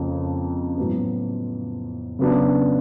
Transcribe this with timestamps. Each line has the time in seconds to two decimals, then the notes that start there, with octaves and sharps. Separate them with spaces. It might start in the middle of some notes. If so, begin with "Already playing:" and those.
Already playing: F2 C#3 F3 A#3
0.78 A2 F#3 B3
2.19 C#3 F#3 B3 D4